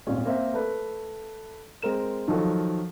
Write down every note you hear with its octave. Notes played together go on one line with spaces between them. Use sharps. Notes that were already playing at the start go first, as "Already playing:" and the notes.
D#1 G#1 C#4 F4
A#3 C4 E5
A3 B4
G#3 C4 A#4 E7
D#3 F3 F#3 F4 A4